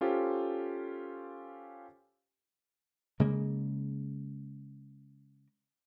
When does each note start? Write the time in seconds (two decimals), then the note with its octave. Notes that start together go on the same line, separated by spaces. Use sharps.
0.01 C#4 F4 G4 A4 C5
3.20 C#3 G#3 A#3